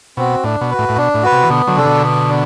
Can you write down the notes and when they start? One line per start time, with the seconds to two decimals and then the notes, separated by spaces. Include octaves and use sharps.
0.17 B2 C4 F#4
0.44 A2 D4
0.61 B2
0.71 F#4 B4
0.79 A2
0.89 A2
0.96 B2 D4
1.15 A2
1.23 F#4 B4
1.32 C3
1.43 E3
1.49 B2 D3 B3
1.67 D3 F#3
1.76 C3 D4 A4
1.85 B2 D3
2.03 B3
2.29 D4